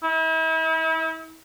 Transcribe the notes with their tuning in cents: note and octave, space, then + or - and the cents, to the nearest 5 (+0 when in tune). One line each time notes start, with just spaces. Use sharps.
E4 -40